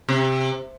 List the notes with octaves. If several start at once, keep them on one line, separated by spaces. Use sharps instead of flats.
C3